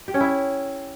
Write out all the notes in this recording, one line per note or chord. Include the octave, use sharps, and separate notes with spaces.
G4
C#4
E4